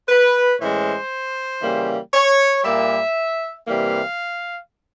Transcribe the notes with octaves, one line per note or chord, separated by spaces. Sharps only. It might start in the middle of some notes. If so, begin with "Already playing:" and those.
B4
A2 E3 G#3 C#4 C5
C#3 E3 G3 A#3
C#5
A#2 G3 A#3 E5
C3 E3 G3 A#3 F5